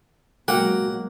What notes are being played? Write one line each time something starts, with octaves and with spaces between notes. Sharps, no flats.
B2 F#3 G#3 A#3 F#4 F#5 G5